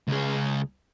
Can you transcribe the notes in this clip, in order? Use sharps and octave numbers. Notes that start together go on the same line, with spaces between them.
C#2 G#4